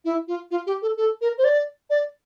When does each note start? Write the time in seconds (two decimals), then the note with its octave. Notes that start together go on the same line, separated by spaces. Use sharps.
0.05 E4
0.28 F4
0.51 F4
0.67 G4
0.82 A4
0.97 A4
1.21 A#4
1.38 C5
1.44 D5
1.90 D5